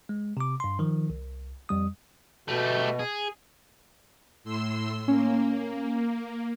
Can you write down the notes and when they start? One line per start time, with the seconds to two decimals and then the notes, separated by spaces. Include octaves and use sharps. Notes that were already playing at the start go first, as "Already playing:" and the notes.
0.09 G#3
0.37 C3 D6
0.60 G2 C6
0.79 D#3 F3
1.10 C2
1.69 F2 G3 D#6
2.48 B2 A3 G4
2.99 G#4
4.44 A2 C6 E6
5.08 A#3 C#4